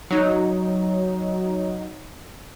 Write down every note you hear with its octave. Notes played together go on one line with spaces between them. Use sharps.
F#3 D#4